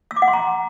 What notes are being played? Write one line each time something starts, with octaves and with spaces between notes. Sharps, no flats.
E6
D6
F#5
C6
A#5